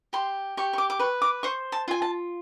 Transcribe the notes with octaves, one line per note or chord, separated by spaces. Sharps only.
G4 C6
G4 C#6
C#6
D6
D6
B4 C#6
D6
C5 C#6
A5
F4 G#5
A5